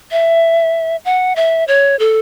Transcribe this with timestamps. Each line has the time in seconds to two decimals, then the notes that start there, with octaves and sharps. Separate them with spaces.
0.12 E5
1.05 F#5
1.36 E5
1.68 C#5
1.99 A4